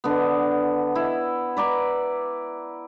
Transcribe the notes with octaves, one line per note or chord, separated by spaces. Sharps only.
D3 B3
E4
B4 D5 A#5 B5